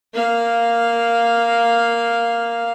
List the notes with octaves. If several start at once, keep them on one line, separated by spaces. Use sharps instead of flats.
A#3 F5